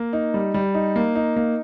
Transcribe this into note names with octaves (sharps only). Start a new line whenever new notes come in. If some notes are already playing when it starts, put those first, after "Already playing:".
Already playing: A#3
D#4
G3
G3
D#4
A#3
D#4
A#3